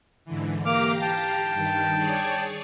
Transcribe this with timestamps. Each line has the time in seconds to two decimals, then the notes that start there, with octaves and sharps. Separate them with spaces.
0.25 G#2 D3 E3
0.66 A#3 G4 F5 A#5 D6 F6
1.02 G5 A5
1.53 G2 D#3
1.97 G#4 C#5 D5